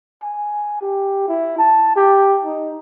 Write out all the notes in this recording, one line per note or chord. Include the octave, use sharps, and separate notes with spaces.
G#5
G4
E4
A5
G4
D#4